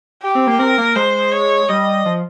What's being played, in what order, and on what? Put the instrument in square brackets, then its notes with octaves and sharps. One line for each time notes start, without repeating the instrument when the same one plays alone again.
[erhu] G4
[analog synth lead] C4
A#3
[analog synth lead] C4 [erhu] A#4
[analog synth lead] A#3
[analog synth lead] G#3 [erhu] C5
[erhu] C#5
[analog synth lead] G3 [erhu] D#5
[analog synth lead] F3